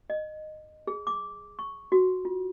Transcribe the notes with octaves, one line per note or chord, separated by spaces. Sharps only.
D#5
G#4
D6
C#6
F#4
F4